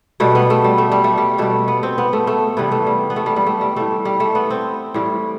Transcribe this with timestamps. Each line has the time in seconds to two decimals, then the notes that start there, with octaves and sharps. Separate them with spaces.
0.20 B2 G3 A3
0.35 B3
0.50 A3
0.64 G3
0.78 A3
0.92 G3
1.04 A3
1.18 G3
1.38 B2 G3 A3
1.68 B3
1.83 C4
1.98 B3
2.13 A3
2.27 A3
2.57 C3 E3 G3 B3
2.72 A3
2.87 G3
3.10 B3
3.16 A3
3.26 G3
3.36 G3
3.46 A3
3.61 G3
3.76 A2 G3 A3
4.05 G3
4.20 A3
4.35 B3
4.50 C4
4.94 A2 E3 G3